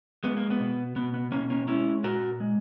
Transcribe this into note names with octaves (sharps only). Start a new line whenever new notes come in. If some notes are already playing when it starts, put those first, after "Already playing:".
G#3 B3
A#3
B3
B2
B2 B3
B3
B2 A#3 C#4
A#3 C#4
G#3 C#4 E4
A#2 F#4 A#4
G#3